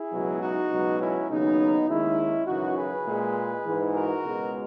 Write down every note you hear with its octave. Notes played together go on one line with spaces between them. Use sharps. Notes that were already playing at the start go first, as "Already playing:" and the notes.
Already playing: E4 G#4
C#2 B2 F#3
D#4 F#4
C#2 B2 F#3
C#4 E4
D#2 C#3 F#3 B3 D#4
D#2 D#3 G#3 C#4 E4
F#2 C#3 E3 D#4 F#4
G#4 B4
A#2 G#3
G#2 E3 G#3
F#4 A#4
C#2 B2 G#3